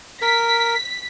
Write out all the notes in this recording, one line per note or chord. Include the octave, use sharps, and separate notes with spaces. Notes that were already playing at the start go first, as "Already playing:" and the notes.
A#4 B6